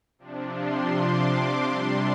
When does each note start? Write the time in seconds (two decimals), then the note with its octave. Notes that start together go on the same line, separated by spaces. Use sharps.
0.19 C3 F3 D4
0.56 C6
0.92 D6
1.65 C3 G3 D4 C6